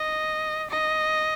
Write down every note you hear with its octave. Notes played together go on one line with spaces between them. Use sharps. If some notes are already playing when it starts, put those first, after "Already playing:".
Already playing: D#5
D#5